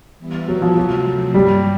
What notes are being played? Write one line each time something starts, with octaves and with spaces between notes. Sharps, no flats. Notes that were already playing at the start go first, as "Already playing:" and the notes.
E3 G3 B3 E4
F#3
F3
C3 F3 F#3 A3 C4
G2 D#3 F#3 G3 A#3